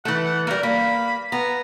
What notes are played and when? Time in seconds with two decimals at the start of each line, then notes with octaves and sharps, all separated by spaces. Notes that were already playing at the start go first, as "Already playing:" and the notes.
0.05 E3 A3 F#5
0.24 F#5
0.47 G3 A#3 A#4
0.63 A#3 B5
1.32 B3 A#5